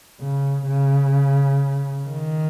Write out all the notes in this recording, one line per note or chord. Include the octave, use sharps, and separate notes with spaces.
C#3
C#3
D#3